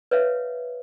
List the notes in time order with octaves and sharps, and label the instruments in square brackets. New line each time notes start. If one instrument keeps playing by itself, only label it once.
[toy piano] B4 C#5 E5 F5